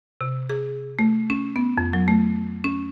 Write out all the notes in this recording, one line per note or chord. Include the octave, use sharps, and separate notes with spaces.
C3
G#4
A3
C#4
B3
F2
F#3
A3
C#4